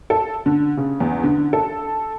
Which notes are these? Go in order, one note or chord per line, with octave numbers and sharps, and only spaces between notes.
A4
D3
C#3
E2
D3
A4